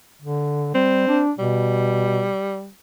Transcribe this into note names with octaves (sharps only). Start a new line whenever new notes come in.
D3
G3 C4
D4
B2 G3